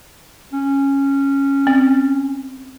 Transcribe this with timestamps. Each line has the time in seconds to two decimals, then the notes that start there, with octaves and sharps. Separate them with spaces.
0.52 C#4
1.67 C4